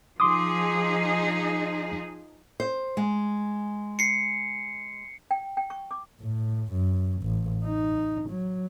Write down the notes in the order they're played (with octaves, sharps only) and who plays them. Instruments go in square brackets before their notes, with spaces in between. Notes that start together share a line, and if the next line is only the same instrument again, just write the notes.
[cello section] F3 D#4 G#4 [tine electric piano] C6 D6 D#6
[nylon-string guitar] C5
G#3
[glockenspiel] C7 C#7
[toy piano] G5
G5
C#6
D6
[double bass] A2
F#2
A1
D#4
F#3